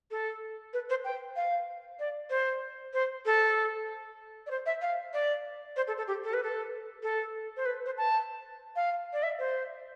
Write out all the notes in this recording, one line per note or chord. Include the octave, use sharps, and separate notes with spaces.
A4
B4
C5
G5
F5
D5
C5
C5
A4
D5
C5
E5
F5
D5
C5
A4
A4
G4
A4
B4
A4
A4
C5
B4
C5
A5
F5
D5
E5
C5